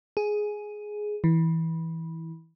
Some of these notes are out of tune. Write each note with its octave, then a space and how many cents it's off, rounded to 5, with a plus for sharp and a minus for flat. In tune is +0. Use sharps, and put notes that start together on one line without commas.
G#4 +10
E3 -15